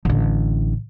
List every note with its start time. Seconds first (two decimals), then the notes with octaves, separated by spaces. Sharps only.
0.05 A1 D3